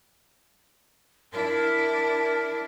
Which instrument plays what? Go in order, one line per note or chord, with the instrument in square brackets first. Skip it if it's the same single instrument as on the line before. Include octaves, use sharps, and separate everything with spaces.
[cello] D4 E4 [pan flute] A#4